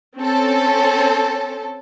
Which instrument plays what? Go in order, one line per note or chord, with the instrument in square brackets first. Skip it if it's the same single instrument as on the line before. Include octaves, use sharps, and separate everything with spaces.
[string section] C4 C#4 A4